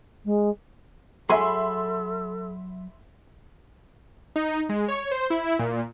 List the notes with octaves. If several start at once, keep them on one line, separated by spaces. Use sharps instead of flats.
G#3
F#3 G#4 A4 E5 G#5 B5 C6
D#4
G#3
C#5
C5
E4
A#2